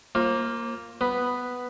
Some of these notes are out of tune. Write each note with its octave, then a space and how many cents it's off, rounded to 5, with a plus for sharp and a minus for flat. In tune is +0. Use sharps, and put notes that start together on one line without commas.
A#3 +0 F4 +0 C5 +35
B3 +5 B4 +0